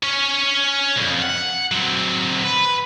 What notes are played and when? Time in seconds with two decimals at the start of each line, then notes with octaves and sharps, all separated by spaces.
0.03 C#4 C#5
0.96 C2 F2
1.22 F#5
1.71 F#3 C4
2.44 B4